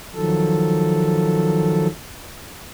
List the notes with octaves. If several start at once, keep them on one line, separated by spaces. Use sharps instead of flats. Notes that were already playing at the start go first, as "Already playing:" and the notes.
D#3 F3 F#3 A4